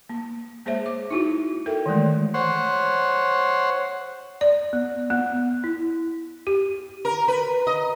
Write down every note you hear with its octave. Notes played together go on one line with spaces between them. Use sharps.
A#3
G#3 A#3 G#4 C5 C#5 E5
D6
D#4 E4 F#4
A4 A#4 E5 G5
D#3 E3 G#3 A3
C5 C#5 F#5
D5
B3
B3
E4
G4
A#4
B4
D#5